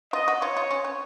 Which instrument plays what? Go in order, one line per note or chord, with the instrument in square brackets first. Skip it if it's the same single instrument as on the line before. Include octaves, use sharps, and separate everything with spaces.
[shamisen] F4 [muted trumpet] D#5
[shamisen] F#4
[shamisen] F4 [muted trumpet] C#5
[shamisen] F4
C#4
C#4